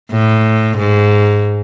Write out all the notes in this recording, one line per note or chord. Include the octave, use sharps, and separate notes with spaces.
A2
G#2